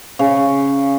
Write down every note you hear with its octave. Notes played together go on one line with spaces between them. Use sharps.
C#3